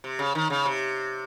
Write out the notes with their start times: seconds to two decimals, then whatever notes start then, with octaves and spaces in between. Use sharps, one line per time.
0.04 C3
0.19 C#3
0.35 D#3
0.50 C#3
0.66 C3